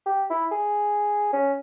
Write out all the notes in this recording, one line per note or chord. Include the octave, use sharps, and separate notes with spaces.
G4
E4
G#4
C#4